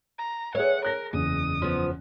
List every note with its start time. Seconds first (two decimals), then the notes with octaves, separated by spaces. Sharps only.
0.18 A#5
0.55 G#4 B4 C#5 E5 F#5
0.85 A#4 F#6 A#6
1.13 F#1 E2 D#6
1.62 F3 B3